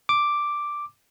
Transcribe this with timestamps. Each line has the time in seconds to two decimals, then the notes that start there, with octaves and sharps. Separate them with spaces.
0.09 D6